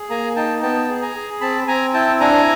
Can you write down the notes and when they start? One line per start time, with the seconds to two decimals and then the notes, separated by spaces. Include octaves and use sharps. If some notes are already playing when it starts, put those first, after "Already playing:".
Already playing: G#4
0.10 A#3 G#5 A#5
0.36 D#4 G5 A5
0.62 B3 G5 A5
0.89 G#4
1.02 G#5 A#5
1.15 G#4
1.41 C4 A5 B5
1.67 C4 G#5 A#5
1.94 E4 G5 A5
2.20 D4 G#5 A#5